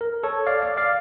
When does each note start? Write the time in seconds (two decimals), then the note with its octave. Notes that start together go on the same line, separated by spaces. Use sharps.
0.01 A#4
0.23 A4 C#5
0.47 D5 F5
0.62 D5 F5
0.77 D5 F5